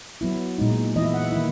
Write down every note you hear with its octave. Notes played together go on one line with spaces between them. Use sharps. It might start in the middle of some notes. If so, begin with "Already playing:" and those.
F#3 B3 E4
A#2 G#3 D#4
E3 B3 E4 D#5
E5
F#5
E5
D#3 A#3 E4